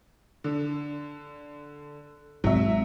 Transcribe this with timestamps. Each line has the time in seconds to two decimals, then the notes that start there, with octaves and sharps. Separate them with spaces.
0.44 D3
2.44 G#1 F#3 E5